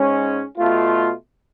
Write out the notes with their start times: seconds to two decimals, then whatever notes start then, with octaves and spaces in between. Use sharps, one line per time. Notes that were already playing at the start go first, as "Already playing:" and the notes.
Already playing: G#2 G#3 C#4
0.58 B2 A3 F4